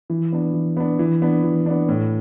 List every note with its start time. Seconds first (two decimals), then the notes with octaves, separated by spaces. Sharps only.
0.10 E3
0.32 B3 D4
0.54 E3
0.77 B3 D4
0.99 E3
1.22 B3 D4
1.44 E3
1.66 B3 D4
1.89 A2